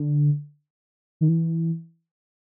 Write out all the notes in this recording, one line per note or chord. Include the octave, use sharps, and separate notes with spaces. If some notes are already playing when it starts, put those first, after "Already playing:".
Already playing: D3
D#3
E3